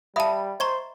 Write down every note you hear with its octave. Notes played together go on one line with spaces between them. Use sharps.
G3 E5 F5 A5 B5 D#6
C5 D#5 A#5 C#6 G#6